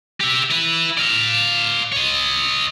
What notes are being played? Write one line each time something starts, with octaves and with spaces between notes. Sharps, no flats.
G4 E5
E4 B4
D5 F5
C#5 D#5